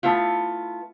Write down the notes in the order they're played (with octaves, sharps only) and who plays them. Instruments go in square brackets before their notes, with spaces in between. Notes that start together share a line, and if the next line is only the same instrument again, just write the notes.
[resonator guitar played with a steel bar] A3 B3 E4 F4